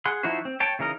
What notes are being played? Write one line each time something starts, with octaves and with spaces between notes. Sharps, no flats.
G#4 F#5 C6
F3 D#4 E4 F#4 C5
C4
C#5 G5 A5
C#3 E3 D#4 A#4 D#5